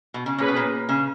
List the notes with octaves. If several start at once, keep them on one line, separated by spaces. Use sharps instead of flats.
B2
C#3
A#2 C#4 G#4 B4
B2
A#2
C#3